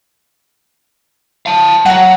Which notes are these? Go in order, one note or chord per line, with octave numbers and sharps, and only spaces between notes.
F5 A5
F#3 F#5 A#5